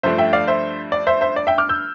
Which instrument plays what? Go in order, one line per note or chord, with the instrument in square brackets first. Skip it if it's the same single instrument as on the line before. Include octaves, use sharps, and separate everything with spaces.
[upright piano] G2 F3 A3 D4 C5 E5
E5 G5
D5 F5
C5 E5
D5
C5 E5
C5 E5
D5
E5 G5
D6 F6
E6 G6